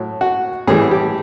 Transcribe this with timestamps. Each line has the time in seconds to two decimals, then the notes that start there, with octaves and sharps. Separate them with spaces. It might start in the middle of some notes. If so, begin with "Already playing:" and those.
Already playing: A2 F#3
0.21 F#4
0.67 A2 E3 G3 G#4
0.91 G4